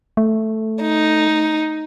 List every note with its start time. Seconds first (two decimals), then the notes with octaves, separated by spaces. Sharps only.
0.17 A3
0.82 D#4